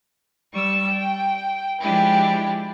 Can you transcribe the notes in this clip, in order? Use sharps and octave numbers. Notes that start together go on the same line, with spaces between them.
G3 C#6 E6
G5
F3 G#3 D4 E4 G4